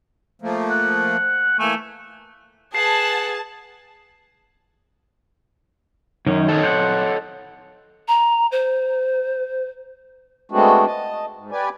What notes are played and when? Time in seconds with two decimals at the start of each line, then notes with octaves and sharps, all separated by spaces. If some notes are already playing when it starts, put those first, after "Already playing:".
0.42 F3 A3 A#3
0.70 F#5
1.59 E3 A3 A#3 G#5
2.75 G#4 B4 F#5 A5 C7
6.27 F#2 D#3 C#4 D#4
6.48 A4 C#5 D#5
6.63 C5 F#5
8.08 A#5
8.52 C5
10.51 G#3 A3 B3 C4 D4 F#4
10.86 D#5 A5
11.35 G#2
11.52 G4 B4 D5 G#5